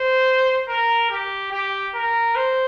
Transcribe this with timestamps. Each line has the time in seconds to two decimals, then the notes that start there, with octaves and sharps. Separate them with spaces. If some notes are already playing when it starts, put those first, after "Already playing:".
Already playing: C5
0.68 A#4
1.10 G4
1.52 G4
1.95 A#4
2.36 C5